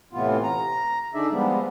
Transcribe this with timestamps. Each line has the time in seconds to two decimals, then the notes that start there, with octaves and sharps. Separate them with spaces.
0.13 A2 C3 E3 B3 F4
0.43 A#5
1.14 D3 D4 D#4 G#4 D5 E5
1.32 F3 G3 G#3 B3